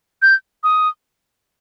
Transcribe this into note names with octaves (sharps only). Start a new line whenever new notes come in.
G6
D#6